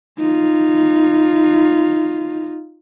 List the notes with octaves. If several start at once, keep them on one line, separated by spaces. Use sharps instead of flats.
D#4 F4